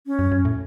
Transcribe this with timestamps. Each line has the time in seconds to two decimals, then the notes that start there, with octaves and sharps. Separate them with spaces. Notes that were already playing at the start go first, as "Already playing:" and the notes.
0.07 C#4
0.19 F#2
0.32 F#2
0.45 A2